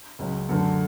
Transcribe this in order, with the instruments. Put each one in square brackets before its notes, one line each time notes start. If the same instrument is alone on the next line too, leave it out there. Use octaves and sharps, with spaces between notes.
[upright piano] C#2 C#3 F#3
F#2 D3 A3